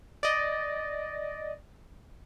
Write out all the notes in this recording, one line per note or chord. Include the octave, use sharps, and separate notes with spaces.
D5 D#5